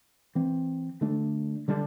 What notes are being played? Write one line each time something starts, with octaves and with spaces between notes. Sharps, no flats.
E3 C4
D3 A3 D4
D3 G3 D4